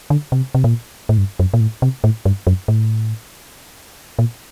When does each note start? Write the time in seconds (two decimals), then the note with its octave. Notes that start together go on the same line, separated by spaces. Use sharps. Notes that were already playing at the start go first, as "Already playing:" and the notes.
0.10 D3
0.32 C3
0.55 C3
0.64 A#2
1.09 A2
1.18 G2
1.40 F#2
1.54 A#2
1.61 A2
1.82 C3
2.04 A2
2.26 G2
2.47 F#2
2.68 A2
4.19 A#2